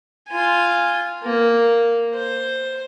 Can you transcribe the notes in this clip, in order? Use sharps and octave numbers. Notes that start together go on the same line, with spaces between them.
F4 G#5
A#3
C5